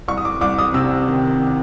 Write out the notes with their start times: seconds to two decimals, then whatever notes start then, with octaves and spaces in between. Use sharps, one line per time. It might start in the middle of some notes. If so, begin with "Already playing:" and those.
0.08 C2 C#6
0.18 D#6
0.25 D6
0.41 C2 D6
0.59 D#6
0.74 C3 E6
1.08 D#3